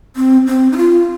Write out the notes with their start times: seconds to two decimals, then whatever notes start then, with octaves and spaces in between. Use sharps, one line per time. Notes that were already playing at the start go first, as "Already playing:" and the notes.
0.16 C4
0.47 C4
0.72 D#4
0.77 F4